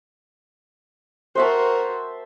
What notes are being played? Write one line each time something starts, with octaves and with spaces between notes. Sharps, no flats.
F#4 A#4 C5 E5 A5